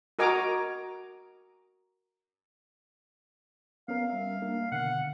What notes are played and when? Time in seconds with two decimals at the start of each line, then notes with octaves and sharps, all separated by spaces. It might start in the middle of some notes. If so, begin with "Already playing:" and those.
0.19 F#4 A#4 D#5 G#5 A#5 D6
3.88 B3 C#4 A#4 F5
4.10 G3 E5
4.42 A#3 D4 A#4
4.72 B2 D3 F#5